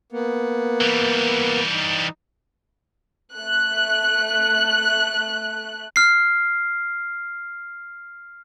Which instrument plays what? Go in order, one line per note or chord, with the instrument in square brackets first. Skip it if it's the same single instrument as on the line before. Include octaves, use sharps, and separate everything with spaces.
[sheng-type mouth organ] A#3 B3
[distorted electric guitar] E3 G3
[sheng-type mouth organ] D#4
[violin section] A3 F#6
[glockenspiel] F6 C7